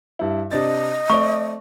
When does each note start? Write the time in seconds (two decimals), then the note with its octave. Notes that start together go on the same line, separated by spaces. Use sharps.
0.19 G2 E4
0.51 C3 D4 D#5 A6
1.10 A3 C4 D5 C#6